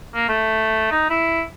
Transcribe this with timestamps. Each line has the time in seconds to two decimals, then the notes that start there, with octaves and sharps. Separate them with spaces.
0.14 A#3
0.29 A3
0.91 D#4
1.10 E4